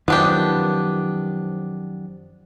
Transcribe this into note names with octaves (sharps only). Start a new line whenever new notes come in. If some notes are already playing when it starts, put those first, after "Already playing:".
F#2 D#3 F3 B3 D4 G4